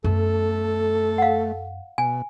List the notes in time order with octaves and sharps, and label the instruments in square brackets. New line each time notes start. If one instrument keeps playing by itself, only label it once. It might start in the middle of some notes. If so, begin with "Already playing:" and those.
[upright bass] F#2 B3 [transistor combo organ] A3 [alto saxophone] A4
[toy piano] F5 F#5
[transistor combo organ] B2 [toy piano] G#5